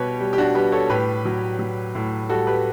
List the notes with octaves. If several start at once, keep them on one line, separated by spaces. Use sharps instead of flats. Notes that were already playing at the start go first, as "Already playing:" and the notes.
Already playing: B2 G3 G4 B4 C#5
G3
G4
D4 F#4
G3 G4 B4
A4 C#5
A2 G4 B4
F#3
F#3
A2
G3 F#4 A4
G4 B4